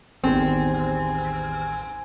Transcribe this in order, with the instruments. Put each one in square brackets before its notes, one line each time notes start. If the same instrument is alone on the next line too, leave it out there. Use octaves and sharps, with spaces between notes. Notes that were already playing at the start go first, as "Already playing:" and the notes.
[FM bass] A1 [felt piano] E2 D#3 G3 [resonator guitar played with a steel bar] C4 [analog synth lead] G#5